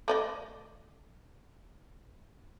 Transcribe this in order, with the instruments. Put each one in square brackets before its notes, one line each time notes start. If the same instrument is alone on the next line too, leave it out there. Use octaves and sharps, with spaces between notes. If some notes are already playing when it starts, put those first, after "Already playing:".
[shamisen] A3 D5 D#5